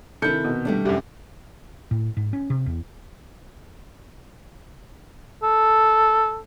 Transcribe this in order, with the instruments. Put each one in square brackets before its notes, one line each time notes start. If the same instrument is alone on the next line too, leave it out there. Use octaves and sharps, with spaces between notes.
[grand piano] C3 D#3 [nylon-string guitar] E4 A4 [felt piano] G6 C#7
[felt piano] B2
[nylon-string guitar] G3 A3 D4
[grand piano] C2 F#2 [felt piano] G4
[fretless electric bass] A2
G#2
C#4
C3
E2
[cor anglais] A4